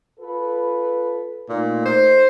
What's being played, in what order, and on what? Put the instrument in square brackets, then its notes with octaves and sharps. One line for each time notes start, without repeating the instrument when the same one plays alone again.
[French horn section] F4 A4 B4
[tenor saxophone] A#2 [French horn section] A3 D#4
[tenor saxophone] C5